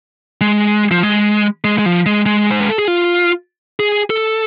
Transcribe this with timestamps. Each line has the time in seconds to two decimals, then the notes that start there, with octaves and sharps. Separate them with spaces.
0.41 G#3
0.92 F3
1.03 G#3
1.64 G#3
1.79 G#3
1.86 F3
2.06 G#3
2.26 G#3
2.51 C5
2.60 B4
2.69 A4
2.78 G#4
2.88 F4
3.80 G#4
4.10 A4